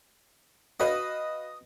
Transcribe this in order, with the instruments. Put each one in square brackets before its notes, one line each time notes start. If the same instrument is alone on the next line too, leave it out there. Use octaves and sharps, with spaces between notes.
[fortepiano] F#4 B4 F5 [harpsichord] D#5